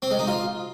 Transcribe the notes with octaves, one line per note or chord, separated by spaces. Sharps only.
C4
G#3
D#4
F4